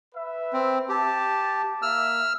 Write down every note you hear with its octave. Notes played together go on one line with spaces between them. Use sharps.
B4 E5
C4
G4 A5
A#3 E5 E6 F6